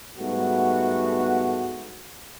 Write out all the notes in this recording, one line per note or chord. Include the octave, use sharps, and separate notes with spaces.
G#2 G3 A3 B3 F#4